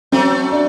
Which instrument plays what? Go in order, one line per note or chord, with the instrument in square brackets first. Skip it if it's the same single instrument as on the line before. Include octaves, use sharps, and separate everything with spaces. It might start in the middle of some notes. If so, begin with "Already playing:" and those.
[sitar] F#3 A3 [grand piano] C4
[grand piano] D4